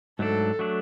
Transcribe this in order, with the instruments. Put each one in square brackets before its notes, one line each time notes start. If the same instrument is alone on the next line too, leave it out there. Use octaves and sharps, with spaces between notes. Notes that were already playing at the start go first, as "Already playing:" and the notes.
[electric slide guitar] G#2 F#3 A3 D4 [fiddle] A4
[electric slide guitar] F#3 A3 D4